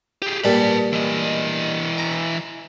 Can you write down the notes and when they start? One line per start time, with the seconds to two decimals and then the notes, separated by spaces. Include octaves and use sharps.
0.22 G4 G#4
0.44 A#2 G3 B4 A5 B5
0.93 E3 D#5
1.98 A#5